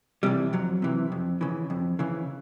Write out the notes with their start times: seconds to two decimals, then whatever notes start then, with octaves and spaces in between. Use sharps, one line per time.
0.23 C3 E3 G3
0.53 F2 F#3
0.82 C3 E3
1.12 F2
1.41 C#3 E3
1.70 F2
1.99 C#3 E3